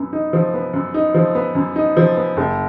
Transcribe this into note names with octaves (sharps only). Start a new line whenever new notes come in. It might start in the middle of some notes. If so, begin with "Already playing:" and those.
Already playing: F#2 B3
D#4
F3
B3
F#2
D#4
F3
B3
F#2
D#4
F3
B3
F#1